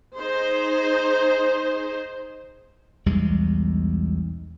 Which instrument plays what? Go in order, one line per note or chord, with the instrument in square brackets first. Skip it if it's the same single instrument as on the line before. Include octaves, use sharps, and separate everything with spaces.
[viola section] D#4 G#4 C5
[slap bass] B1 E2 G3 G#3